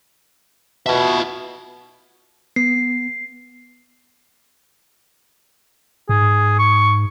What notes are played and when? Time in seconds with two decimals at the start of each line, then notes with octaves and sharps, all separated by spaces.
0.86 B2 F4 E5
2.56 B3 C7
6.09 G#2 G#4
6.59 C#6